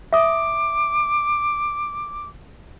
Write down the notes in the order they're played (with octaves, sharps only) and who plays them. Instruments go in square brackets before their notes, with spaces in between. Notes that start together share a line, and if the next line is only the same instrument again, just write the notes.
[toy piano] E5 D#6 [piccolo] D6